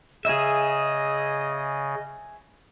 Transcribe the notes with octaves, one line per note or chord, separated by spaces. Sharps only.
C#3 G#4 D#5 E5